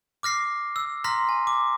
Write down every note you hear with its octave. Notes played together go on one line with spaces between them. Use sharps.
D6 F6 A#6 C7
E6
A#5 C6 F6 A#6 B6
G#5
D6